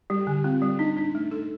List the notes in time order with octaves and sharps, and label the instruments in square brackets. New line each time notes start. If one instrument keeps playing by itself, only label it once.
[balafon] G3 [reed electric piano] G4
[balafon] D3
[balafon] C4 [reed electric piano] F4
[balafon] G3
[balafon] D4 [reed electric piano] D#4
[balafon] D4
A3
A4